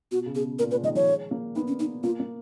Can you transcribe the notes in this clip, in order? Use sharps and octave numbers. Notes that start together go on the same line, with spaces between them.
B2 F#4
C#3
B2 G#4
A#2 A#4
A#2 B4
D#3 D#5
F3 C#5
G#3
A#3
B3 D#4
C#4
B3 D#4
A#3 F4
A#3